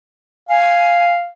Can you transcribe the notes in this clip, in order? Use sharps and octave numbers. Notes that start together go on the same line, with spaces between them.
F5 G#5